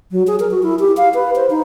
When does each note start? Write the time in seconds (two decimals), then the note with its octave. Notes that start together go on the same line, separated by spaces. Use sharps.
0.12 F#3
0.27 G#4
0.40 A#4
0.51 F#4
0.63 E4
0.79 G4
0.97 F5
1.15 B4
1.36 C5
1.50 D#4